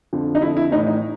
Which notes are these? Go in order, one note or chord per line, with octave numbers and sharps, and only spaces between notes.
F2 D3 F3
D#4
F2 D3 F3 E4
E4
A2 E3 D#4
D#4